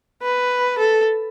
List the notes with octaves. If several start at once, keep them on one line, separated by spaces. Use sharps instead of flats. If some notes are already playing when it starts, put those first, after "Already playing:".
B4
A4